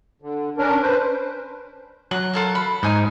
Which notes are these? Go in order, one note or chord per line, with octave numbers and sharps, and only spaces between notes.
D3
C#4 D4 A#4
B4 C5
F#3 F#6
F4 A4 A#4
B5
G#2 G#3 D#4 G#5